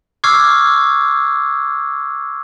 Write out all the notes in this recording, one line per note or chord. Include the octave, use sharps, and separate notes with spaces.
C#6 D6 E6 F6 G#6 C7